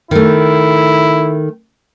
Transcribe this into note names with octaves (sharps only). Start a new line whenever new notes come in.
D#3 A3 E4